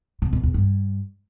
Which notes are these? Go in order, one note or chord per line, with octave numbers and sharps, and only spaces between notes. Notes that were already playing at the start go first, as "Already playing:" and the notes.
C3
B2
E2
G2